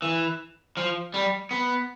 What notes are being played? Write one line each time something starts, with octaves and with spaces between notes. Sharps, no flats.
E3
F3
G3
B3